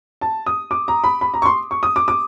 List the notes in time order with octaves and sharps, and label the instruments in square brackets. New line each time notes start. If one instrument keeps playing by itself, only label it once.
[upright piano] A5
D#6
D6
A#5
B5
B5
A#5
C#6
C6
C#6
D#6
D6
D6